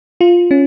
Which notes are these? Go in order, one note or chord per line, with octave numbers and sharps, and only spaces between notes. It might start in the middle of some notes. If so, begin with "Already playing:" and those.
F4
C#4